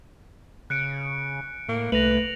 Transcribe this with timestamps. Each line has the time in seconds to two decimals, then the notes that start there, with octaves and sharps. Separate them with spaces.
0.70 C#3 F#6 C#7 D7
1.69 A2 A#3
1.92 C2 A3 B4 A#6 F7 F#7